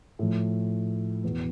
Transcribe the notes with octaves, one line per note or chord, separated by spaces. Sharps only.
A2 F3
E2 B2